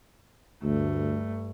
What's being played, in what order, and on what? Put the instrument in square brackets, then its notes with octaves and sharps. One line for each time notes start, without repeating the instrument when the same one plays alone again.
[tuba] D2 [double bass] G2 A3